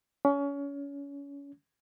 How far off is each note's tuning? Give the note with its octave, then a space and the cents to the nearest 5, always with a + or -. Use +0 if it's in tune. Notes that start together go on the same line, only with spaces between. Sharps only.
C#4 +30